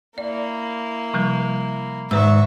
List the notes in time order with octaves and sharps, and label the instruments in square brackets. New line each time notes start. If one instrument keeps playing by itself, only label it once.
[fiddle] A#3 E4 [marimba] D5
[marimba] C3 F3 G3
[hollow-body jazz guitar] G#2 [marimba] D#3 B4 E6 [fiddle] E5 C#6